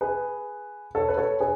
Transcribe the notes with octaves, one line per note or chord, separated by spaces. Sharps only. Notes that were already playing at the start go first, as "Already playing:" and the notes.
G#4 B4
A4 C#5
B4
A4 C#5
G#4 B4